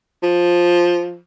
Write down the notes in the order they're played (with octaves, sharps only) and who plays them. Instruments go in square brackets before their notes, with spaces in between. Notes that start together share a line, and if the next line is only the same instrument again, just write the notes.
[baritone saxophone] F3